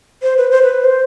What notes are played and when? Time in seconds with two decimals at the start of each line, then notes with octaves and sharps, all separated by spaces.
0.22 C5
0.37 B4
0.51 C5
0.63 B4
0.84 C5